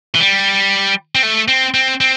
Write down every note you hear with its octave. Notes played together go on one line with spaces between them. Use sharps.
E3
G3
C4
A3
C4
C4
C4